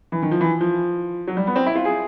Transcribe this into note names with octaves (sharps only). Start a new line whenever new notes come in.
E3
D#3
F3
E3
F3
F#3
G3
B3
C4
E4
F4
G#4